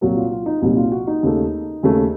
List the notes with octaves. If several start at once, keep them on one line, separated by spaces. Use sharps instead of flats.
C2 A#2 F#3 A#3 F#4
F4
F4
D#4
C2 A#2 F#3 A#3 D#4
F4
F#4
D#4
D#2 C#3 A3
D#2 C#3 A3